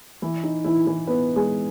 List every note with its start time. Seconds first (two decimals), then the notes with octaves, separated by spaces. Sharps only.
0.22 E3 E4
0.44 D#4
0.64 E3 E4
0.86 E3 E4
1.07 B3 B4
1.36 G#3 G#4